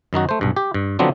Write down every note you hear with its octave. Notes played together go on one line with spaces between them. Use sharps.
F#2 D#3 D#4 F#4
A3 C5
B1 G2
G4
G2
D3 F3 F#3 B3 C4 D4